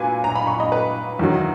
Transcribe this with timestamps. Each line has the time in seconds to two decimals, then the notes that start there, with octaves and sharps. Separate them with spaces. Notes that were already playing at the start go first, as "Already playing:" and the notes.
Already playing: A#2 F#3 B4 G#5
0.24 A#5
0.35 B5
0.47 C#6
0.60 D#5
0.72 B4
1.19 E2 D#3 F#3